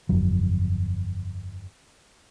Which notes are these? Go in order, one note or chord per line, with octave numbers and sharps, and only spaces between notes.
G1 F2 F#3